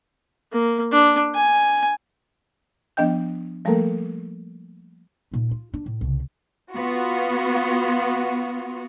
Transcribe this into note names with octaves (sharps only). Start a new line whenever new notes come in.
A#3
D4
G#5
F3 B3 D4 D#5 G5 G6
F3 G3 A3 A#3 A4 A#4
A#2 D#4
F4
D4
A2
C2 C#3
B3 F4 F#4